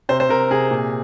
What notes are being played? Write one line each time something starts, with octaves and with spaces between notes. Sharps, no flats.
C3 C5
C5
C3 A#4
C3 G#4
A#2